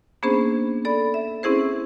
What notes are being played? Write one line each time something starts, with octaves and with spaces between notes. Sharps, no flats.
A#3 B3 C#4 D4 G#4 C5
A4 D5 B5
E5
C4 C#4 E4 G#4 C5